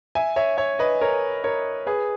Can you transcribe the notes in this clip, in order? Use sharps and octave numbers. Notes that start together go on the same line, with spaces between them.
E5 G#5
C#5 E5
C#5 E5
B4 D#5
A#4 C#5
A#4 C#5
G#4 B4